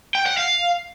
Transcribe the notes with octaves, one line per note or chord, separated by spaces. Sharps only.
G5
F#5
F5